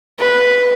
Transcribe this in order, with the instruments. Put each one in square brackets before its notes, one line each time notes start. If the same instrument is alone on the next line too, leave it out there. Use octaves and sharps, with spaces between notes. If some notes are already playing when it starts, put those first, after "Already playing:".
[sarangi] B4